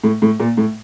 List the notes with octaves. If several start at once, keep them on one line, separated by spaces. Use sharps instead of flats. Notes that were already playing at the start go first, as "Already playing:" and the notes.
A2
A2
A#2
A2